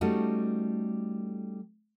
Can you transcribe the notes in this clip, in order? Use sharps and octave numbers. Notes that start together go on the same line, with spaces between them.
G3 A3 C#4 D#4 F#4